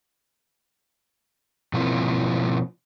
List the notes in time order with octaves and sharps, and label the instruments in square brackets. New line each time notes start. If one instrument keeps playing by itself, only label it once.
[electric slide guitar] B2 F3 A#3 C4 E4 F4